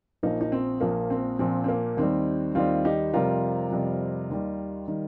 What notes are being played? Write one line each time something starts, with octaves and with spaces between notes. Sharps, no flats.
A#1 A#2 F3 A#3 D#4
D#4
C4
A#1 A#2 F3 A#3
C4
A#1 A#2 F3 C4
C4
A#3
D#2 D#3 G3 C4
D#2 D#3 G3 C4 F4
D#4 G4
F2 C3 G3 F4 A#4
F2 C3 G3
D#2 D#3 G3
D#3 G3